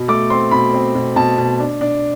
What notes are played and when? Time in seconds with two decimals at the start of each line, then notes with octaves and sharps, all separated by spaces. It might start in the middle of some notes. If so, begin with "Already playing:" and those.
Already playing: B2
0.08 A3 D6
0.30 C4 C6
0.51 B2 B5
0.73 C4
0.95 B2
1.16 B2 A5
1.38 B2
1.60 D4
1.81 D4